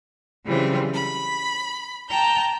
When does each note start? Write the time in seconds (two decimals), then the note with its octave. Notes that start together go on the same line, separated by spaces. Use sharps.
0.45 C#3 E3 F#3 G3 C4 F4
0.93 B5
2.10 G5 A5 A#5 G6